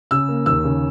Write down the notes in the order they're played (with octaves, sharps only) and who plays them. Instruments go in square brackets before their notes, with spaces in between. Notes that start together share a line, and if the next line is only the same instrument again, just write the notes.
[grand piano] C#3 E6
A#3
D#2 E6
C#3